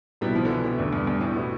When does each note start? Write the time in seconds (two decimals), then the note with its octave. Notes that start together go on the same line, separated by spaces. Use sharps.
0.21 C2 B2 G3 B3 E4
0.35 F3
0.45 D3
0.49 E3
0.64 D3
0.78 E2 D3 A3 D4
0.93 G2
1.07 G2
1.21 A2
1.36 B2 G3 B3 E4